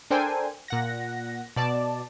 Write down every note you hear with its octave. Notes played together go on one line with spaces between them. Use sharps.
D4 A4 A#4 C5 G5 G#5
A#2 F#5 A#6
B2 D5 A5